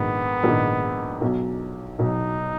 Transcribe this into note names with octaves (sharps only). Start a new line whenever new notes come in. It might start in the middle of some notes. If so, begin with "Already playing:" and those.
Already playing: A#1 G#2 D#3 B3
A#1 G#2 D#3
B1 B2 F#3
B1 B2 F#3 D#4